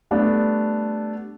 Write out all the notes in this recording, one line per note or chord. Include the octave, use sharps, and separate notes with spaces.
G3 A3 B3 D4